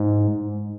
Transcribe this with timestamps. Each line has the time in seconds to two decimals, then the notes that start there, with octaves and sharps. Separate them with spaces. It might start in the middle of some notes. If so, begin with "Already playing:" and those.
Already playing: G#2